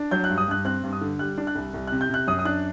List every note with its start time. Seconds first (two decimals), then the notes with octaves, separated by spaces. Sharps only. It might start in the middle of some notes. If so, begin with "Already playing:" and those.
Already playing: D4
0.11 F#3 G6
0.24 F#6
0.29 G2
0.38 D#6
0.48 G2 F#6
0.65 C4 F#6
0.83 G2
0.93 D#6
1.01 D3
1.19 G3 F#6
1.38 D4
1.47 F#6
1.55 C2
1.74 C2
1.87 F#6
1.92 C3
2.01 G6
2.09 C3 F#6
2.27 F#2 D#6
2.39 D#6
2.45 D4 F#6